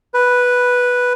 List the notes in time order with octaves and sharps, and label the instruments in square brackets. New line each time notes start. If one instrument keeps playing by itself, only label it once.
[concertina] B4